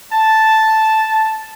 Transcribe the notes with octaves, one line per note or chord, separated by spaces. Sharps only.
A5